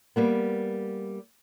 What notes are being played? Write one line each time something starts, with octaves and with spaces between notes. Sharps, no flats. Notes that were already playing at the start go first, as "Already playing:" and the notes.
G3 A#3 B3